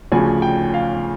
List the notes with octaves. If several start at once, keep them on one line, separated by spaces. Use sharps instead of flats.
D2 C#3 F3 G#5
G5
F5